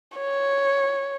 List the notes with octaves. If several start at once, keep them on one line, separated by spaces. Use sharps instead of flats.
C#5